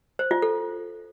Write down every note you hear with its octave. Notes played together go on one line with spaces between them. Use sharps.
C5
F4
A4